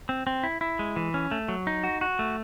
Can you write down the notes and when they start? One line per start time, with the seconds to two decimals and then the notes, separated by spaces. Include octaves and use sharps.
0.09 C4
0.27 C4
0.43 E4
0.61 E4
0.79 G#3
0.96 E3
1.14 C#4
1.31 A3
1.48 F#3
1.67 D#4
1.84 F#4
2.01 F#4
2.19 A3